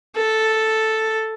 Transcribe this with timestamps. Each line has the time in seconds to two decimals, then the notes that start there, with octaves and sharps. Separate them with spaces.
0.15 A4